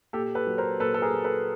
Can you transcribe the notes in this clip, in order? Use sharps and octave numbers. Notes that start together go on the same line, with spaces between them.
A#2 G4 A4
A4 B4
F#3
A#4 C5
A#2 A4 B4
A4
G#4 A#4
F#3
A4 B4